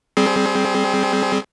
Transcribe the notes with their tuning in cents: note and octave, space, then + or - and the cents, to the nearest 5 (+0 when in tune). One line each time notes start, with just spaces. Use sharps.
G3 +0 C4 +0 G#4 +25